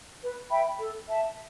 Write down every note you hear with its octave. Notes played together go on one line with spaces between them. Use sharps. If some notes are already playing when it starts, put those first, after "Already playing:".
B4
E5 G5 B5
A4
E5 A5